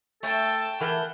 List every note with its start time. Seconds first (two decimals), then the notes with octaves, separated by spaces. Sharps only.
0.23 A3 A4 G5 A5
0.81 E3 A#4 F#5 A5 G6